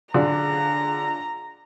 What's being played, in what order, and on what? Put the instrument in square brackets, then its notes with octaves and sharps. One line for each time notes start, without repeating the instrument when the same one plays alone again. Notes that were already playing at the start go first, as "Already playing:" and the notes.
[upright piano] D3 [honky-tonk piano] D4 F4 G#4 [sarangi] A#5